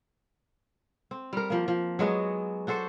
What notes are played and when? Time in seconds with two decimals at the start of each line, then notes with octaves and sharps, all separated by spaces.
1.11 C4
1.33 G3 A#4
1.50 F3 A#3
1.68 F3
1.99 F#3 G#3 B3 F#4
2.67 D4 F#4 A4 C5